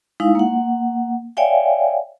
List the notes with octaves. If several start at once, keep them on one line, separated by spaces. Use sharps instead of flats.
G#3 D#4 E4 F5
A#3 F#5
C#5 D5 E5 F5 G5 G#5